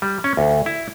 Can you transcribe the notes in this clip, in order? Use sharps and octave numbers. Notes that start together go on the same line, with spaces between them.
G3
C#4
D2
E4